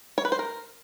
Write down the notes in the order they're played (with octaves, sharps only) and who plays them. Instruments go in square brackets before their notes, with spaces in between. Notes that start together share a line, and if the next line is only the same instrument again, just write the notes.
[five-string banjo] C#5
B4
C5
A#4